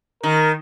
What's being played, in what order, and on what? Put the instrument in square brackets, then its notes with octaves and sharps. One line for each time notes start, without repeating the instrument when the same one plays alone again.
[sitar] D#3 [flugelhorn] A#4